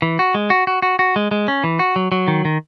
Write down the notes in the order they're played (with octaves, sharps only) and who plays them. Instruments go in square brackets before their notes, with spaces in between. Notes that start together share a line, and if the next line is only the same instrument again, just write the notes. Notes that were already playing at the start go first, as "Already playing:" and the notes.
[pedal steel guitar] E3
F#4
G#3
F#4
F#4
F#4
F#4
G#3
G#3
C#4
E3
F#4
F#3
F#3
D#3
D#3